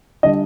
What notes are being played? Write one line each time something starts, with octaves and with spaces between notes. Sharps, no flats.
D3 G3 D4 D#5